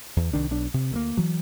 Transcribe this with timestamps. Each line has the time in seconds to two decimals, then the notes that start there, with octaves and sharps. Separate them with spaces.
0.17 E2
0.33 C2 D#3 D4
0.51 B1 D4
0.74 C3
0.91 D2 A3 A#3
1.17 E3 F#3